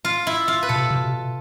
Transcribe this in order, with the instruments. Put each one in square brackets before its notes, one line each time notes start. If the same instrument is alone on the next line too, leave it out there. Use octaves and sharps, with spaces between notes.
[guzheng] F4
E4
F4
B4
[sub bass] B2 [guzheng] A4
[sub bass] C3
B2
C3
B2
C3
B2